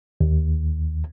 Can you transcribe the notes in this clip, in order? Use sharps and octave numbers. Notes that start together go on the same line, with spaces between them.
D#2